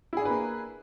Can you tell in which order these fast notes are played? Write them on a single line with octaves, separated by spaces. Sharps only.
E4 G#4 D4 B4 A#3